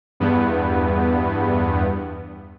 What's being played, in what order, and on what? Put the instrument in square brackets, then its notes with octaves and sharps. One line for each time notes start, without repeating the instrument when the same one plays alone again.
[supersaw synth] E2 G2 B3